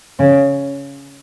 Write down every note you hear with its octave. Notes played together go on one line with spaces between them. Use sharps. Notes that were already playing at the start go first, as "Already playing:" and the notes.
C#3